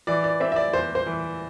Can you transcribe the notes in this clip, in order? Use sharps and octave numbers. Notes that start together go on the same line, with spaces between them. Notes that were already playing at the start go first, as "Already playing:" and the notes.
E3 D5
D5
C4 E5
E5
D5
E2 C5
C5
E3